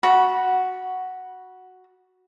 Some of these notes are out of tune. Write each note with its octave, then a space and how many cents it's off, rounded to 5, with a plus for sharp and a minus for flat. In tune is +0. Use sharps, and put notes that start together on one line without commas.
F#4 +0 B5 -25